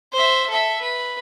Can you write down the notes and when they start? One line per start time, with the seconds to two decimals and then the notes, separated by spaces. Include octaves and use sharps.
0.13 C5 E5
0.50 A4 E5
0.81 B4